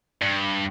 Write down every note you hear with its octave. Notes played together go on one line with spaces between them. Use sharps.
G2